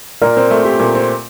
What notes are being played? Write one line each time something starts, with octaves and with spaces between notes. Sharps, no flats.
A#2 A#4 D5
C4
A3
G4
A#2
C4